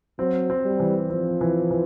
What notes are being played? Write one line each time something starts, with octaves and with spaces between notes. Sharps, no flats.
F#3 C4
C4
G3
E3
F3 C4
E3
E3